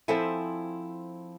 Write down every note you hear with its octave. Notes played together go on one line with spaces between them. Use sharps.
F3 C4 E4 A4 E5 G#5